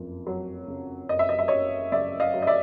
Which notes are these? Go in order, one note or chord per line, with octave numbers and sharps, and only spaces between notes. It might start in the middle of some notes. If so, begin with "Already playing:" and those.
Already playing: F#1 F2
F#3
C#3
F#1 D#5
E5
D#5
E5
F#1 C#5 D#5
C#3 D5 E5
D#5 F5
F#3
D#5
D5 E5